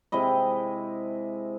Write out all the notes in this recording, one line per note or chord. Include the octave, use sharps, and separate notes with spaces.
C3 G#3 E4 D#5